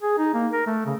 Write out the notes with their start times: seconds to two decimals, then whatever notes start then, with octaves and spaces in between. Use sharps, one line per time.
0.02 G#4
0.18 D#4
0.34 A#3
0.53 A#4
0.67 A3
0.86 C#3